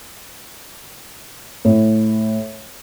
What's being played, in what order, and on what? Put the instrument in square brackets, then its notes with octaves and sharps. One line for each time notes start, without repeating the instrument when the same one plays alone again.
[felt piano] A2